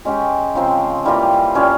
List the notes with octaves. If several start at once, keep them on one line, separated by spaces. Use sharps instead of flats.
G#3 C#4 G4
C#3 F3 C4
E3 G3 A#3 F4
A#2 G3 C#4